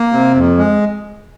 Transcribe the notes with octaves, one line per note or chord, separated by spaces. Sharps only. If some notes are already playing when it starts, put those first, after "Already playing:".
Already playing: A#3
C3
F2
G#3